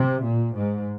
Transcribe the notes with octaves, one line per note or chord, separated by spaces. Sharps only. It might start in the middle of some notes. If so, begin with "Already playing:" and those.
Already playing: C3
A#2
G#2